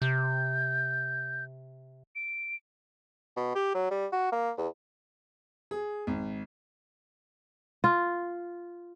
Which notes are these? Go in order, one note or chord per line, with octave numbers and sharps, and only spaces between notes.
C3 G6
D7
B2
G4
F#3
G3
F#4
A#3
E2
G#4
G#1
F4